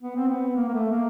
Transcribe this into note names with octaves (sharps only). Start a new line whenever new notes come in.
B3
C4
B3
A#3
A#3
A3
A#3